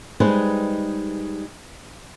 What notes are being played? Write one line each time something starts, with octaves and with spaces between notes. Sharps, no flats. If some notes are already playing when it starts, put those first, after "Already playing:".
G3 G#3 D#4 G#4 B4 C5